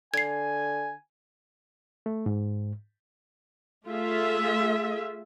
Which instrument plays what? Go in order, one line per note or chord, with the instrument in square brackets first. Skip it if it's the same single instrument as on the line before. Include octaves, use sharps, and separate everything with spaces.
[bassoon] D3 [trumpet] G#5 [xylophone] G#6 C7
[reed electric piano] A3
G#2
[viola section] A3 F4 G#4 E5